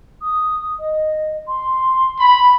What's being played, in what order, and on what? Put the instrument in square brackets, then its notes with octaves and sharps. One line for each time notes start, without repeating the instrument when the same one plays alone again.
[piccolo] D#6
D#5
C6
[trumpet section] B5